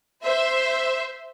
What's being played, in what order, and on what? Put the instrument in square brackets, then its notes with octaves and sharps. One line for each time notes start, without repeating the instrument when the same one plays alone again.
[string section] C5 E5